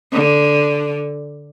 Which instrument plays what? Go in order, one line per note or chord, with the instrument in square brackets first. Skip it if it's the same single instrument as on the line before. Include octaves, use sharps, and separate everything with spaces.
[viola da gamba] D3